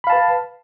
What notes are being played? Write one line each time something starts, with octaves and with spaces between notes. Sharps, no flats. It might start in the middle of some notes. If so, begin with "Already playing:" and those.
B4 F5 A5 B5